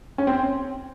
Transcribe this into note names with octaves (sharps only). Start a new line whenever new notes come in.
C#4
C4